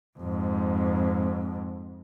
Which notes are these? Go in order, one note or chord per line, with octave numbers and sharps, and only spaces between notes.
F2 G#2